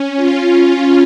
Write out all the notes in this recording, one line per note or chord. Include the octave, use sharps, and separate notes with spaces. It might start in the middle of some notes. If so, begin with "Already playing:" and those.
Already playing: C#4
F4